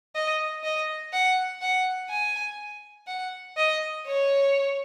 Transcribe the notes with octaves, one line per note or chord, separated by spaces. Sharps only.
D#5
D#5
F#5
F#5
G#5
F#5
D#5
C#5